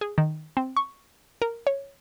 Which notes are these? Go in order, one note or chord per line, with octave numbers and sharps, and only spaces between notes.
G#4
D#3
C4
C#6
A#4
C#5